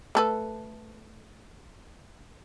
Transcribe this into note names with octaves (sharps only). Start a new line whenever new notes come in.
A3 A4 B4